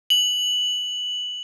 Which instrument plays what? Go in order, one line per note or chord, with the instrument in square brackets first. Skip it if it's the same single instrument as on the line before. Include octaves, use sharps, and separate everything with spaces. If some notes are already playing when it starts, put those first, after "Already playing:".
[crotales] F#7